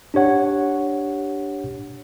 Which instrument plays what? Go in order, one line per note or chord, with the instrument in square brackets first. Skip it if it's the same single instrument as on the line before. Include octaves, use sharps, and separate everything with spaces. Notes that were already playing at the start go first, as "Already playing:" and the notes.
[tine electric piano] D4 G4 C#5 F#5